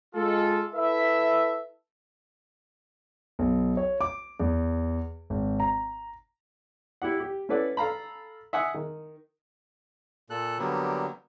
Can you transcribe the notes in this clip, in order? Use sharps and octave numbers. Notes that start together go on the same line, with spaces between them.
G#3 F4 A4
E4 A4 B4 E5
B1
C#5
D6
E2
G#1
A#5
E4 G4 F#5
G4
C#4 E4 A4 B4 D5 F#5
A4 F5 A#5 B5
E5 F#5 G#5 D#6
D#3
A#2 A4 F#6
D3 F#3 G3 A#3 B3